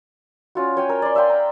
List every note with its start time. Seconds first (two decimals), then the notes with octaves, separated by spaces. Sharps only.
0.55 C#4 F4 F#4
0.77 C#5 G5 G#5
0.89 A#4
1.02 D5 C6
1.15 E5 F5 G5 C6
1.30 A#5